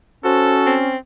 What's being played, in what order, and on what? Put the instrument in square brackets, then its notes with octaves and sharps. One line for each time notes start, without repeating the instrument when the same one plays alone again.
[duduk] C#4 [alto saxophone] F#4 [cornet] A4 [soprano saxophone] C5
[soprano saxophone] C4